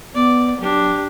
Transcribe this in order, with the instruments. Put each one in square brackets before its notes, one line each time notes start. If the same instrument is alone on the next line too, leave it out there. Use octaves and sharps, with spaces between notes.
[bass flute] B3 [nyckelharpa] D5
[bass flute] F#3 [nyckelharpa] D4 G4